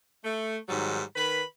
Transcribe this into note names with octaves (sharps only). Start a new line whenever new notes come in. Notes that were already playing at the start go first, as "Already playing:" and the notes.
A3
G#2 D#3 F#3 G3
D#3 B4 B5